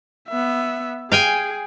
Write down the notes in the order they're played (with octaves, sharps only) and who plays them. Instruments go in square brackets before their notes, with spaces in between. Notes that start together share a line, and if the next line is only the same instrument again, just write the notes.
[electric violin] B3 E5
[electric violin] G#4 [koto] F5 G5 G#5